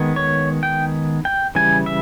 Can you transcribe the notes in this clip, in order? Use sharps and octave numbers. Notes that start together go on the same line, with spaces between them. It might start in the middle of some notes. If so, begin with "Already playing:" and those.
Already playing: D#3 G#3 B3
C#5
G5
G5
C#3 E3 G3 G#5
E5